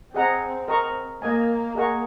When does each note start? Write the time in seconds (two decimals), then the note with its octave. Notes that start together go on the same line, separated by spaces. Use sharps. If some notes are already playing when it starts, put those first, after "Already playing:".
0.14 C4 G#4 D#5 F#5 A#5
0.68 A#4 D#5 A#5 C#6
1.22 A#3 A#4 D#5 G#5
1.75 G#4 D#5 F#5 A#5 C#6